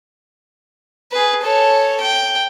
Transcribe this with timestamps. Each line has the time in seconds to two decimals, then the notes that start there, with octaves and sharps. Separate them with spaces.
1.12 G#4 B4
1.41 A4 C#5
2.00 G5